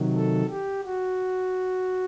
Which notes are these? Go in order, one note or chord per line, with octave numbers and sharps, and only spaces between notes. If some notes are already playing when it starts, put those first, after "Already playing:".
Already playing: C3 D#3 F#3
A4
G4
F#4